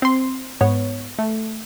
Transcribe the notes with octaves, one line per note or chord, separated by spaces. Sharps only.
C4 C6
G#2 B3 C#5
A3